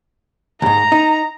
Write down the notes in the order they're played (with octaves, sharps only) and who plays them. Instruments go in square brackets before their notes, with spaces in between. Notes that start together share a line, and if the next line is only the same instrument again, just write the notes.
[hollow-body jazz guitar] D2 G#2 [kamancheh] A#5
[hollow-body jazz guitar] D#4